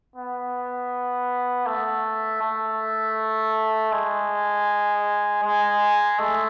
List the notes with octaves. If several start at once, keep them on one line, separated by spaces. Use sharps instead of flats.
B3
A3
A3
G#3
G#3
A3